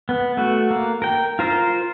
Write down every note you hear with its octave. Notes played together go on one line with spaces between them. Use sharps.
B3
A3 F#4
A#3
A#4 G5
F4 A#4 C5 A#5